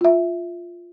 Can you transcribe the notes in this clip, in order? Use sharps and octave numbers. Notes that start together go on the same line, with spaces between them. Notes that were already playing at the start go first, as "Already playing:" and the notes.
F4 E5